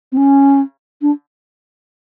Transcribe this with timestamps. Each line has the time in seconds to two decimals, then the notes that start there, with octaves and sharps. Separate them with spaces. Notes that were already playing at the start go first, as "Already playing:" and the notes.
0.12 C4
0.17 C#4
1.02 D4